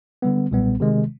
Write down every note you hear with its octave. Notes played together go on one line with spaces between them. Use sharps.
D3 G3 B3
B1 A#2 G3 B3
C3 D#3 G#3